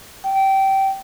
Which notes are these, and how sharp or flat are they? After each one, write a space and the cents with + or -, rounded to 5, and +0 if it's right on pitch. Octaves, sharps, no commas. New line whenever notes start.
G5 -20